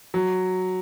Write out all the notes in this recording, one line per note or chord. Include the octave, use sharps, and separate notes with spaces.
F#3